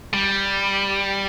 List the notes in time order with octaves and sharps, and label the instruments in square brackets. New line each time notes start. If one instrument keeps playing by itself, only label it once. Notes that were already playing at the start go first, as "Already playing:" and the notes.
[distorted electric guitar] G3